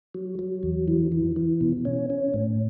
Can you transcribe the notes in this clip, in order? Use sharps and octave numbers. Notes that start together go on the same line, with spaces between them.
F#3
F#3
E2
E3
E3
E3
B2
C#4
C#4
A2